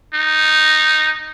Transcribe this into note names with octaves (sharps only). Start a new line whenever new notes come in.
D#4